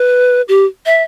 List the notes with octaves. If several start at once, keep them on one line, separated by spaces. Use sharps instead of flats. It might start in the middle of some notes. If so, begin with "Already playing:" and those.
Already playing: B4
G4
E5